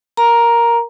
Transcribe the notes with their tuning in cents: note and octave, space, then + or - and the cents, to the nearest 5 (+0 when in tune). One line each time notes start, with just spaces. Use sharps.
A#4 +0 A#5 +10